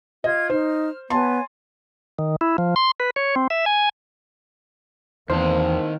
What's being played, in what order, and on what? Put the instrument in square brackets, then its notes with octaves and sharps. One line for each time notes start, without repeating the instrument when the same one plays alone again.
[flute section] F4 G#6 [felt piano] D#5
[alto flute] D#4 [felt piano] C5 [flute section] F6
[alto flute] B3 [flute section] C#5 G#5 [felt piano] A5 C6
[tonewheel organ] D#3
E4
F3
C6
B4
C#5
C4
E5
G#5
[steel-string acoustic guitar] E2 [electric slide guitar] D#3 A5 [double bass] A#3 C4 [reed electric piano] C5